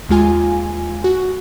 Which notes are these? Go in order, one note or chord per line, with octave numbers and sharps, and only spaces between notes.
D#2 G#3 F4 G#5
F#4